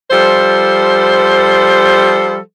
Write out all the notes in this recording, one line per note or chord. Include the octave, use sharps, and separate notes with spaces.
F3 G3 A4 C5